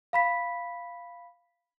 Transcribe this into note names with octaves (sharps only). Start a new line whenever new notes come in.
F5 B5 B6